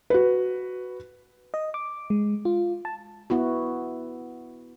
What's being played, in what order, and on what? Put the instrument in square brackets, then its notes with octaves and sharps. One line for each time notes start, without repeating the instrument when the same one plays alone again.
[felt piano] F#4 B4
[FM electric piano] D#5
D6
G#3
F4
A5
[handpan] B3 E4 F#4